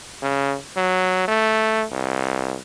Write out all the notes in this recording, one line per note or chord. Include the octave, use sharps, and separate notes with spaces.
C#3
F#3
A3
C2